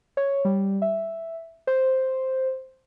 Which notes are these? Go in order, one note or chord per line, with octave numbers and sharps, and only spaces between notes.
C#5
G3
E5
C5